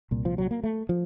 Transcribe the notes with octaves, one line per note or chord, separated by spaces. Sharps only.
C2 A#2
F3
F#3
A#3
A3
F3